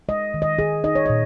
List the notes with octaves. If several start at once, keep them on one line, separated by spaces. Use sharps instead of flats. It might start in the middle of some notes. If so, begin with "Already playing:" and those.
G#3 D#5
D#3
D#5
D#3 G#4
D#4 D#5
C#5
A#2 D#5